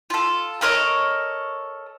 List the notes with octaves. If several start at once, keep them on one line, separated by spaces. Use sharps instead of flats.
F4 A4
A4 A#4 C#5 D#5